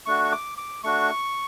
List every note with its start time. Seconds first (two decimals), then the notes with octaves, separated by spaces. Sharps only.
0.06 A3 D4 F#4 C#6
0.24 C#6
0.32 D6
0.58 D6
0.84 A3 D4 F#4 C#6